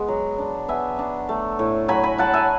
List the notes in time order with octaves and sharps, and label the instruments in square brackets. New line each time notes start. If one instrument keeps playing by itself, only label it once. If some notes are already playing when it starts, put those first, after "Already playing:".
Already playing: [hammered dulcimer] G#3 B3
F#3
D4
B3 E5 G#5
D4
A3
A2
F#3 G#5 B5
G#5 B5
F#3 F#5 A5
E5 G#5